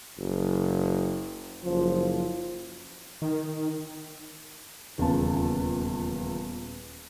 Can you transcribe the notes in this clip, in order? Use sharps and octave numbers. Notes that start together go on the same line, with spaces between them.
F#1
F#1 F3
D#3
D#1 E2 C#3 F4 A5